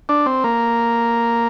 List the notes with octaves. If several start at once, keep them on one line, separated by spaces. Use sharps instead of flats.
D4
C4
A#3